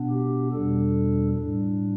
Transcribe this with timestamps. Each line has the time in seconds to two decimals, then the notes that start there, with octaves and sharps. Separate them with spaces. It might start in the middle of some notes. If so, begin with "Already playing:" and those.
Already playing: B2 B3 D4
0.11 G4
0.51 E2 B2 G3 D4 A4
1.35 A2 G3 D4